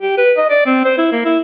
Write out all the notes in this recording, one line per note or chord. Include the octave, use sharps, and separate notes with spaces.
G4
B4
D#5
D5
C4
C5
E4
A#3
E4